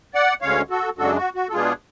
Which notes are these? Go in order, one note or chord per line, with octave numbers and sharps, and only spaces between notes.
D5 F#5
D2 D3 G#3 C#4 C#5 F5
F#4 A4
F#2 C#3 G#3 D4 F#4 A4
F#4
F#4
A4
B2 G#3 B3 D4 F4 G#4